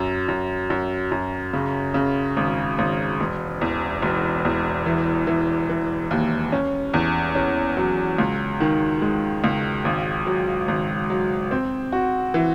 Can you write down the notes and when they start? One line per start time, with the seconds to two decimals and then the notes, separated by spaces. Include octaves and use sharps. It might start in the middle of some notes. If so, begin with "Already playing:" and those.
Already playing: F#2
0.28 F#2
0.70 F#2
1.12 F#2
1.53 C#3
1.94 C#3
2.37 G#1
2.78 G#1
3.20 E1
3.61 E2
4.03 E1
4.45 E2
4.86 E3
5.27 E3
5.69 E3
6.11 D#2
6.52 C#4
6.94 E2
7.35 C#4
7.77 F#3
8.18 C#2
8.60 D#3
9.02 G#3
9.44 C#2
9.85 G#1
10.27 F#3
10.68 G#1
11.10 F#3
11.51 C4
11.93 F#4
12.34 E3